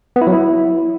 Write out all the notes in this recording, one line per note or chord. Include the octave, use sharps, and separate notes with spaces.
B3
E4
F#3
E4